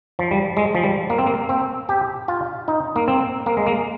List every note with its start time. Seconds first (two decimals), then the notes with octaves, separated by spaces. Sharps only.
0.19 F3
0.31 G3
0.57 G#3
0.75 F3
0.83 G3
1.10 A#3
1.18 C4
1.26 A#3
1.49 C4
1.89 G4
2.28 F4
2.68 D#4
2.96 A#3
3.08 C4
3.46 A#3
3.57 G#3
3.66 A#3